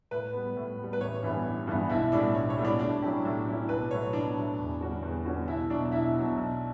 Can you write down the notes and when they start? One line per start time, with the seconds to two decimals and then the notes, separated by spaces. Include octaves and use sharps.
0.11 A2 B4
0.33 G3 B3
0.57 A2
0.78 B3
0.84 G3
0.93 B4
1.01 A1 C#5
1.23 G2 E3 G3 B3
1.46 A1
1.67 G2 E3 G3 B3
1.90 B1 E4 E5
2.12 A2 G3 B3 D4 D5
2.34 B1 C#5
2.50 C#5
2.57 A2 G3 B3
2.65 D4 D5
2.79 A2 D4 D5
3.02 F#3 C#4 E4 G4
3.25 A2
3.46 F#3 C#4 E4 G4
3.68 B1 B4
3.91 A2 F#3 C#5
4.13 B1 D4 D5
4.36 A2 F#3
4.59 E2
4.81 D3 G3 C#4 F#4
5.02 E2
5.25 D3 G3 C#4 F#4
5.48 B1 E4 E5
5.70 B2 F#3 D4 D5
5.92 B1 E4 E5
6.14 B2
6.19 F#3
6.37 B1